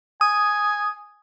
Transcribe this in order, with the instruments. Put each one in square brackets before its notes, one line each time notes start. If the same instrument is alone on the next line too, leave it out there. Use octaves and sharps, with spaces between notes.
[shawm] G#5 [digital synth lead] D#6